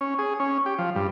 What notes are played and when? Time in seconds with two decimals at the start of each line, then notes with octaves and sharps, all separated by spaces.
0.01 C#4
0.19 G#4
0.40 C#4
0.66 G4
0.78 F3
0.95 G2